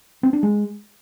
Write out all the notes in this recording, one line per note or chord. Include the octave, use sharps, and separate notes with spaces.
C4
D4
G#3